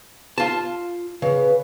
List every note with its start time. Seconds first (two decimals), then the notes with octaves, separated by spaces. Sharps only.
0.38 F4 A5
1.22 C#3 B4